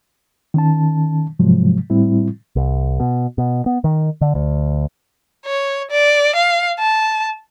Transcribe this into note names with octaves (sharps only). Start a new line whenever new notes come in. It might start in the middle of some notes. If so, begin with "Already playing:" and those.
D#3 C#4 A5
G#2 C3 F3 F#3 G#3
A2 G3 C4 E4
C2
B2
B2
B3
D#3
D3
D2
C#5
D5
F5
A5